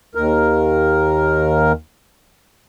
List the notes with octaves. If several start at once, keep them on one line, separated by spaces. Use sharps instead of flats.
D#2 A#4